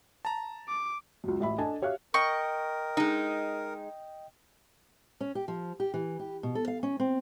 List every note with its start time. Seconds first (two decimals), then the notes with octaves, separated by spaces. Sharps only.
0.25 A5 A#5
0.68 D6
1.24 C#2 F#2
1.40 A1 E5 B5
1.58 D4 A4 D#5 G#5 A5
1.82 G4 C#5 E5 F5 F#6
2.14 A#4 D#5 G5 C#6
2.97 G#3 D#4
5.21 C#4
5.35 G4
5.48 F3
5.80 G4
5.94 E3
6.19 G4
6.43 B2
6.55 A4
6.67 F5
6.83 C#4
7.00 C4